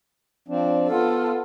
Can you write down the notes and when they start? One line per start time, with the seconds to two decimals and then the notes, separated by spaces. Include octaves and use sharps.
0.48 F3 C4 D4
0.88 B3 F4 A4